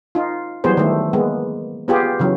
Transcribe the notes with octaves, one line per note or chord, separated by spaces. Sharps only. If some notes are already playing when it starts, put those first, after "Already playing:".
D#4 F4
E3 F#3 G3 B3 G#4 C5
D#3 A3
G#3 A#3 B3
B3 F4 G4 G#4
C#3 E3 F#3